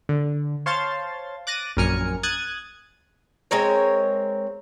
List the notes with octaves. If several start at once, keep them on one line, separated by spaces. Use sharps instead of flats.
D3
C5 C#5 F5 A5 C6 A6
D6 F#6 A6 A#6 D#7
A#1 F#2 A#4 G#5 F6 C#7
D#6 F#6 G#6 A6
G#3 C4 A#4 C#5